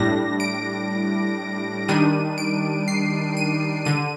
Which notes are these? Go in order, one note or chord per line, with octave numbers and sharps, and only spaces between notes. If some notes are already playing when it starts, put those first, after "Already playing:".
Already playing: A2 G3 D4 A#6
D7
D#3 G3 D4 D#7
D7
C7
D#7
D3 D#7